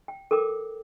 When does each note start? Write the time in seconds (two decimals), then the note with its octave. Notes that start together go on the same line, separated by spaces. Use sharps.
0.08 G5
0.31 A4 A#4 G5 D6